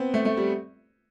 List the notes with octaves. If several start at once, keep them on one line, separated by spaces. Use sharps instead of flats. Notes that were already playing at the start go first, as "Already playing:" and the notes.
Already playing: B3 C4
A3
A3
G3